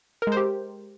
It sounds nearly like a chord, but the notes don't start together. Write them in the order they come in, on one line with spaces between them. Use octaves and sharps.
A#4 G#3 C5 G4